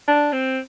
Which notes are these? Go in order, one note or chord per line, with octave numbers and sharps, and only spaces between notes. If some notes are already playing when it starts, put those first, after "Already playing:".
D4
C4